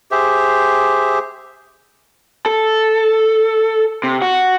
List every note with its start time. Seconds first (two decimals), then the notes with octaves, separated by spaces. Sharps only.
0.11 G4 G#4 C5 E5
2.46 A4
4.04 C3
4.22 F#4